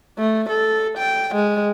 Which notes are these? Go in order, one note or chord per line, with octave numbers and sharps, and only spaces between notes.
A3
A4
G5
G#3